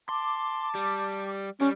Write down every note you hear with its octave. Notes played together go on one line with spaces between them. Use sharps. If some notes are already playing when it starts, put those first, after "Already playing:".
A5 C6 D6
G3
G3 C#4